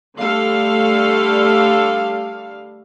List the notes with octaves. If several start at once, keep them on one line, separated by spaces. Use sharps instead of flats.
D3 G3 A3 A4 F5